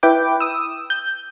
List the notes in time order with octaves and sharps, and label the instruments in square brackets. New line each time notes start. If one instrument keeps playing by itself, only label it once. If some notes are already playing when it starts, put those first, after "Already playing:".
[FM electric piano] E4 B4 G5 D6
D#6 E6
G6